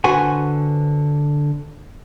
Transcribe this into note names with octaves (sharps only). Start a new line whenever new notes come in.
D3 F#4 B4 C5 F#5 G#5